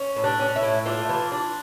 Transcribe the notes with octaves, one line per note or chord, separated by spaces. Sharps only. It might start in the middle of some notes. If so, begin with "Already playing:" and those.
Already playing: C#4
A2
D4
C#4
E4
A2
A3 D4 F4
E3
D4